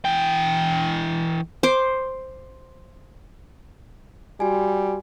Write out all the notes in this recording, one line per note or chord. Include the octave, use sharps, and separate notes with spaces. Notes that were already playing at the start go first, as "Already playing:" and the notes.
E3 G5
C5 D6
G3 F#4 G#5